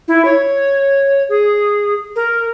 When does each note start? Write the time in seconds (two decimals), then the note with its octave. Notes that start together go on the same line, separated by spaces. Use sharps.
0.08 E4
0.25 C#5
1.29 G#4
2.16 A#4